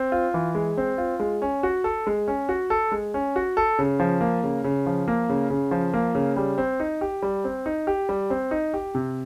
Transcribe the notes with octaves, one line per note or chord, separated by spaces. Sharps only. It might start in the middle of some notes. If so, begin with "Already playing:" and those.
Already playing: C4
F4
E3
G#3
C4
F4
G#3
C#4
F#4
A4
G#3
C#4
F#4
A4
G#3
C#4
F#4
A4
C#3
F3
A#3
C#3
C#3
F3
A#3
C#3
C#3
F3
A#3
C#3
G3
C4
D#4
G4
G3
C4
D#4
G4
G3
C4
D#4
G4
C3